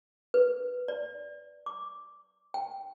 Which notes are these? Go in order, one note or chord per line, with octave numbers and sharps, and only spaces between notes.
B4
D5
D6
G5